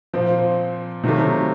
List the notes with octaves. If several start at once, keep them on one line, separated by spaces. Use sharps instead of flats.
A#2 F3 C4
C3 D#3 F#3 A3